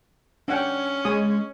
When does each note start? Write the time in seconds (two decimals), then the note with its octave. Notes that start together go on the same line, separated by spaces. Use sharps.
0.48 C#4 D4 F#5 G5
1.05 G#3 C#5 G#5 D#6